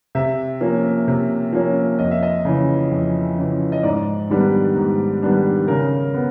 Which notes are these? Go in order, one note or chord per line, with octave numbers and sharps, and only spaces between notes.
C3 E5
F3 A#3 C#4
C3
F3 A#3 C#4
F2 D#5
E5
D#5
C#3 E3
F2
C#3 E3
D#5
G#2 D5
D#3 G3 B3 D4
G#2
D#3 G3 B3 D4
C#3 A#4
B3